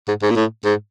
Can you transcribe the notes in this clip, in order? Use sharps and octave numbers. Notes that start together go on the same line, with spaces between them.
G#2
G#2
A#2
A2
G#2